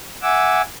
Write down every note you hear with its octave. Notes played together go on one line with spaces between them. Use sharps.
E5 F#5 G#5 D6 E6